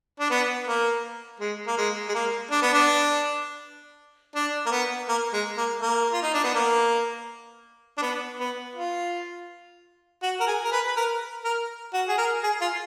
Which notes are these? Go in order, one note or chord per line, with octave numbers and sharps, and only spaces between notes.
D4
B3
A#3
G#3
A#3
G#3
G#3
A#3
D4
B3
D4
D4
A#3
B3
A#3
G#3
A#3
A#3
F4
D#4
D4
B3
A#3
D4
B3
B3
F4
F#4
A#4
G#4
A#4
B4
B4
A#4
A#4
F#4
G#4
A#4
G#4
F4